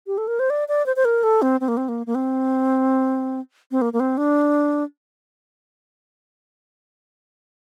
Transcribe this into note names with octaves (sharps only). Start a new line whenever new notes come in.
G4
A4
A#4
C5
D5
D5
C5
C5
A#4
A4
C4
C4
A#3
C4
A#3
A#3
C4
C4
A#3
A#3
C4
D4